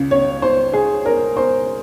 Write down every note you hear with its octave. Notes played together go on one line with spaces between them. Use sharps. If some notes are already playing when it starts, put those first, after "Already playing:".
Already playing: C#2 C#3
C#5
C5
G#4
A#4
C5